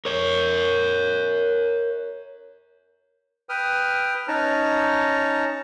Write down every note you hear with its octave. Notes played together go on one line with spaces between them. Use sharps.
A#4 C#5
B4 G5 D#6 F6
C#4 D#4 C#5 A5 A#5